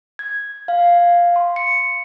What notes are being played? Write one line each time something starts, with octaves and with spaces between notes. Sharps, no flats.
G#6
F5
C6
C#7